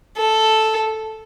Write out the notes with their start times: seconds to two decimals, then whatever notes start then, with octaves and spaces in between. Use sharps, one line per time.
0.17 A4